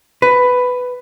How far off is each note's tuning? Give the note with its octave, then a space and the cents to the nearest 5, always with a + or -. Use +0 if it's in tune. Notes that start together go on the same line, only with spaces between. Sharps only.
B4 +10